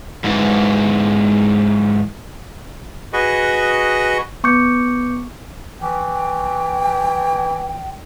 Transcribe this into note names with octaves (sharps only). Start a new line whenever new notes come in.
G#2 E3
F#4 G#4 B4 D#5 C#6
B3 C#6 D6 G6 C#7
E3 G5